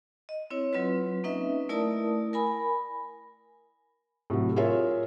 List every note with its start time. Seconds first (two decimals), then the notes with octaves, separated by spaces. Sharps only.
0.29 D#5
0.50 C4 E4 C#5
0.73 F#3 C4 F4 B4
1.24 A#3 C#4 D#4 B4 D#5 E5
1.69 A3 E4 A#4 D5 A5 D#6
2.33 A#4 G#5 B5
4.30 A2 C3 F#3
4.56 F4 G#4 A#4 C#5 E5